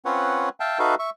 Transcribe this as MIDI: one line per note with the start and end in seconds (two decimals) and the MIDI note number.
0.05 0.49 60
0.05 0.49 61
0.05 0.49 65
0.05 0.49 71
0.05 0.49 73
0.05 0.49 78
0.60 0.79 76
0.60 0.79 77
0.60 0.79 79
0.60 0.79 81
0.79 0.95 63
0.79 0.95 66
0.79 0.95 69
0.79 0.95 71
0.79 0.95 76
0.79 0.95 77
0.99 1.10 76
0.99 1.10 85